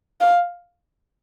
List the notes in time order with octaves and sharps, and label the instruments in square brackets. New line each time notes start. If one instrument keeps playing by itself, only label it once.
[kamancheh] F5